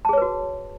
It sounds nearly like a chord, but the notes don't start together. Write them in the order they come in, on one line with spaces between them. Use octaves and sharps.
A5 G#4 C#5 B4 F#4